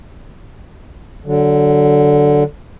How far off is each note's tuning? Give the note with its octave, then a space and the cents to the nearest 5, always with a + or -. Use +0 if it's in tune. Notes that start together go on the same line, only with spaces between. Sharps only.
D3 +0 F#3 +15